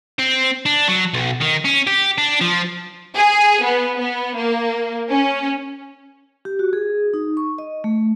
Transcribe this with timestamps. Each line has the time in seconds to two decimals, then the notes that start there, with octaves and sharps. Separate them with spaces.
0.19 C4
0.66 D4
0.88 F#3
1.14 B1
1.41 D#3
1.65 C#4
1.87 G4
2.18 D4
2.41 F3
3.16 G#4
3.64 B3
4.00 B3
4.37 A#3
5.10 C#4
6.45 G4
6.59 F#4
6.73 G#4
7.14 D#4
7.37 C#6
7.58 D#5
7.84 A3